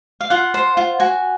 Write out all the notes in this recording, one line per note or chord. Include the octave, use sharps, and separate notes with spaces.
F5
F4 F#5
C5
F4
F#4 G#5